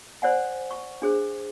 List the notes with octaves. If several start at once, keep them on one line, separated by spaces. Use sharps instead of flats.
C5 D5 F#5 G#5
C#6
D4 G#4 C5